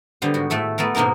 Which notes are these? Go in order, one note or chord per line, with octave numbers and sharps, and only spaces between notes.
D3 G3 B3 C5
G#2 F#4
A2 A3 A4 E5
A3 B3 A4 A#4
G#2 B2 A#3 D#4 A#4